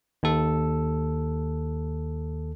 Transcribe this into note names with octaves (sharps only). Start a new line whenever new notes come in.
D#2 A4